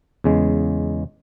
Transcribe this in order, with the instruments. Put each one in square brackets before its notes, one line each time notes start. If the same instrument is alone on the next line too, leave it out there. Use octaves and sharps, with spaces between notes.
[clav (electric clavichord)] E2 C#3 G#3